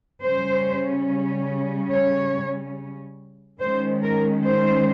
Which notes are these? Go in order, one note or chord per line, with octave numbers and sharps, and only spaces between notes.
C#3 G3 C#4 C5
C#5
D#3 G#3 C#4 C5
A#4
C5